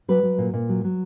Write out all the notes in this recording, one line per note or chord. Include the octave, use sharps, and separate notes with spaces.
F#3 B4
F#3
A#2
A#2
F#3
F#3